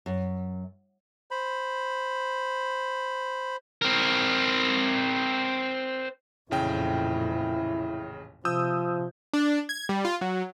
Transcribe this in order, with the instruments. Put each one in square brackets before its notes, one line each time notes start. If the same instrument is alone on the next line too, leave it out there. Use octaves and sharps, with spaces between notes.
[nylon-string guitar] F#2
[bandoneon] C5 B5
[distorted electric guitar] C4 A#4
[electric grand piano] A1 C#3 G5 [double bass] F2 A#2 [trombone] E4
[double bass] C3 [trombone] F3 [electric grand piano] D#6 E6 G6
[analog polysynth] D4
G#6
G3
F4
F#3